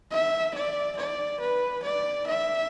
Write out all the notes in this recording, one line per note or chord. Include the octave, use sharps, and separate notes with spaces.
E5
D5
D5
B4
D5
E5